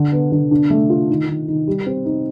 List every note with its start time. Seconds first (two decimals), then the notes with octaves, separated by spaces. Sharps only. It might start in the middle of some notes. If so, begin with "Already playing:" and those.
Already playing: D3
0.12 B3
0.32 D3
0.51 D4
0.70 A3
0.90 F4
1.09 D#3
1.28 D#3
1.48 D#3
1.67 G3
1.86 C4
2.05 D#4